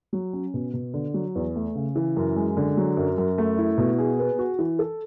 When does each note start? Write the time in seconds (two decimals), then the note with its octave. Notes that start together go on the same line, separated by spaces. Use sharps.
0.13 F#3
0.33 C#4
0.54 B2
0.74 B2
0.94 D3
1.14 F#3
1.36 E2
1.56 A3
1.75 C#3
1.96 E3
2.17 F#2
2.36 G#3
2.57 D3
2.77 F#3
2.97 F#2
3.18 F#2
3.38 A3
3.58 E4
3.78 B2
3.99 G#4
4.19 B3
4.39 F#4
4.59 E3
4.79 A4